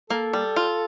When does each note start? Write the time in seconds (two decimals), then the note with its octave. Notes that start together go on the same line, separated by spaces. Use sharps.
0.10 A#3 A4
0.33 G3
0.56 F4